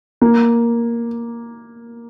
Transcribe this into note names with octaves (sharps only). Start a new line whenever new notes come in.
A#3